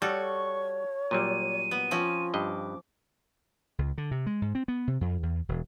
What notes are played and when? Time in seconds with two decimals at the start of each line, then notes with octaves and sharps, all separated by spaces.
0.02 G3 F#4 A4 C#5 C#6
1.11 A#2 F#3 G3 D#7
1.71 B3
1.91 F3 C4 C#4 F4
2.34 G2 D#5 D6
3.78 C#2
3.98 D3
4.11 C3
4.26 G#3
4.42 G#2
4.55 C4
4.68 B3
4.87 C3
5.01 F2
5.23 E2
5.49 E1